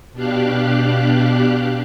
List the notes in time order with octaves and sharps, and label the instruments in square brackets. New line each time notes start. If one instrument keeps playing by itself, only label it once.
[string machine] B2 D4 G4 F5 F#6